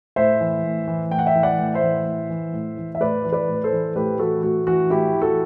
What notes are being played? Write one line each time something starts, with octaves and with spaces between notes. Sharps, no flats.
A2 C5 E5
E3
A2
E3
A2 G5
F#5
E5 G5
E3
D5 F#5
A2
C5 E5
E3
A2
E3
A2
E3
E5
A2 B4 D5
E3
B4 D5
A2
A4 C5
E3
A2 G4 B4
E3 F#4 A4
A2 F#4
E3 F#4
A2 E4 G4
E3
F#4 A4